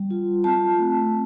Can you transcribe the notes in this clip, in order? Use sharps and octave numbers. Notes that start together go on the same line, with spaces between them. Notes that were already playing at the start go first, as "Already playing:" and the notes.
Already playing: G3
F4
C4 A5
A3